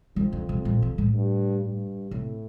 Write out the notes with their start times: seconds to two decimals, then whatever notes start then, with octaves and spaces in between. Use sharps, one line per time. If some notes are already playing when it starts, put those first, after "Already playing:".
0.16 F2 D#3
0.33 D3
0.49 C3
0.65 A#2
0.82 C3
0.98 A2
1.14 G2
1.63 G2
2.11 A2 C3